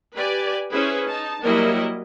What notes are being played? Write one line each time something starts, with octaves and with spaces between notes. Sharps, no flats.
G4 B4 D5 G#5
C#4 E4 G#4 B4 C5
D#4 A5
F#3 G3 A#3 E4 A#4 D#5